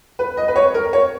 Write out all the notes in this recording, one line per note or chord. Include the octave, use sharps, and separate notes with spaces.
B4
D#5
B4
C#5
A#4
C#5